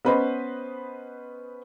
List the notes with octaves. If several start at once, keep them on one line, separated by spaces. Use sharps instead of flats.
B3 C#4 B4 C5 D#5 B5